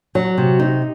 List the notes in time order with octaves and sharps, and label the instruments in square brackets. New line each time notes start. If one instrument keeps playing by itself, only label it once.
[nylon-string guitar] F#3
C3
D#4